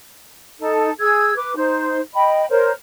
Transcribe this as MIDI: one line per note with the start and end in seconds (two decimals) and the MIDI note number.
0.60 0.89 63
0.60 0.89 69
1.00 1.34 68
1.00 1.34 88
1.00 1.34 92
1.37 1.56 71
1.37 1.56 86
1.56 2.00 63
1.56 2.00 72
2.14 2.46 75
2.14 2.46 79
2.14 2.46 83
2.50 2.72 70
2.50 2.72 72
2.50 2.72 73